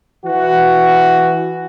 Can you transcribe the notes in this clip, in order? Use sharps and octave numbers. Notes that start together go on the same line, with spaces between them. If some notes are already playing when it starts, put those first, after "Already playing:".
E3 F#4